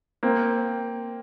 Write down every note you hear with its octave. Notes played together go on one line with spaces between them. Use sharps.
A#3 C4